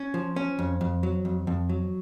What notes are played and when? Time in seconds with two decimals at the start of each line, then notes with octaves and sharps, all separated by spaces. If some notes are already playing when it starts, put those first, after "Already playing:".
Already playing: C#4
0.14 F3
0.36 C#4
0.59 F2
0.81 F2
1.03 F#3
1.25 F2
1.47 F2
1.69 F#3